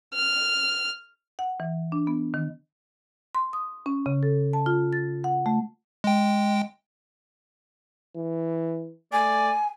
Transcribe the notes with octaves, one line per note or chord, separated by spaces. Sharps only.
F6
F#5
E3
D4
B3
D#3
C6
D#6
C#4
C#3
A4
A5
F4
A6
F#5
A3
G#3 G5
E3
A3 D5 G#5